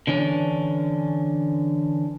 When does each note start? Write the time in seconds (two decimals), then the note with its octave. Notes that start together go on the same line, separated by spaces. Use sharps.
0.07 D3 E3 C#4 D4